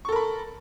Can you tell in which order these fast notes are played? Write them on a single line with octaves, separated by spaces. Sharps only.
C#6 A4 A#4 B5